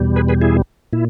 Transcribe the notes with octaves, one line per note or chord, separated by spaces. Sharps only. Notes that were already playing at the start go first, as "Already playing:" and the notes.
Already playing: E2 B2 G3
G#4 B4
G#4 B4
E4 G#4
A#2 E4